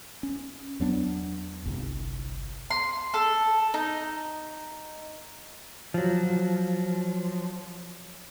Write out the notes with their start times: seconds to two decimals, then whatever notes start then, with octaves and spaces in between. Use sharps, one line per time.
0.23 C#4
0.80 E2 F#3 B3 D4
1.65 G1 C2
2.70 C6
3.14 A4
3.74 D#4
5.94 F3 F#3